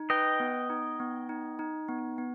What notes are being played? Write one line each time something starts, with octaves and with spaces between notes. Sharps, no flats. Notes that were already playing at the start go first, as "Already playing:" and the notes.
Already playing: D#4
B4 D#5 G5
B3
D#4
B3
D#4
D#4
B3
B3